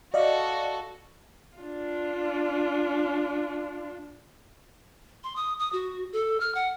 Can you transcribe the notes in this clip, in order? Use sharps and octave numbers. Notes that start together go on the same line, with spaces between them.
F#4 A4 D5 D#5 F5
D4 F4
C6
D#6
D#6
F#4
A4
F6
F#5